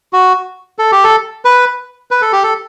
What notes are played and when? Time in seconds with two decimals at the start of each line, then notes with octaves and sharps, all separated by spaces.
0.13 F#4
0.79 A4
0.92 G4
1.04 A4
1.45 B4
2.11 B4
2.22 A4
2.33 G4
2.43 A4